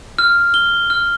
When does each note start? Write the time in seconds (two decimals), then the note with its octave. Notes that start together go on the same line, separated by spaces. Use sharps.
0.18 F6
0.54 G7
0.90 F6